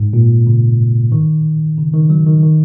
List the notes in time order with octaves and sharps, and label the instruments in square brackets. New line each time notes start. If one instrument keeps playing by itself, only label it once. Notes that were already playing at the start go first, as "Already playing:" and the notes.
Already playing: [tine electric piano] G#2
A#2
C#3
D#3
C#3
D#3
F#3
D#3
D#3